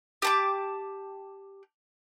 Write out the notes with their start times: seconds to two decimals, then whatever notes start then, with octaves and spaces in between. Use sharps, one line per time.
0.22 G4 A5 D6